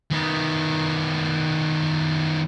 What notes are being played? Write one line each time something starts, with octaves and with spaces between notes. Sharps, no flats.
D#3 B3